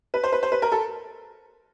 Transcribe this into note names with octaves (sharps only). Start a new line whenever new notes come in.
B4
C5
B4
C5
B4
A#4
A4